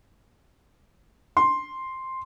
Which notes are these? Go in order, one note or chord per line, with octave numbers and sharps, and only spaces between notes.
C6